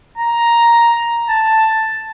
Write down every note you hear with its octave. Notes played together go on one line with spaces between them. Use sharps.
A#5
A5